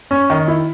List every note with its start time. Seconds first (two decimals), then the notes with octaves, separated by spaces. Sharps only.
0.11 C#4
0.30 D#3
0.48 E4